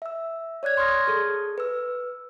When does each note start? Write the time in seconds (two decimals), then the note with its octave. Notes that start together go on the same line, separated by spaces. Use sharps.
0.02 E5 E6
0.63 C#5 D5 F#6 G#6
0.77 C6 C#6 D#6 F6 G#6 A#6
1.07 G#4 A4
1.58 B4 E6